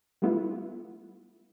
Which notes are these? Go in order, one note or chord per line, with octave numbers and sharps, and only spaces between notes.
G3 A3 B3 E4 F4